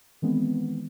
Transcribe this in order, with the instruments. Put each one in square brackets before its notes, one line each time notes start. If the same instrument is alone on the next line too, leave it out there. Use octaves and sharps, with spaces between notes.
[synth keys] D#3 E3 G#3 B3 C4